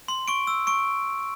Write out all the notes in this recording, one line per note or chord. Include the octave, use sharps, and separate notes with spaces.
C6
C#6 D7
E6
C#6 D7